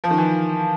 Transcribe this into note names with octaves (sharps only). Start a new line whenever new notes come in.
F3
D#3
E3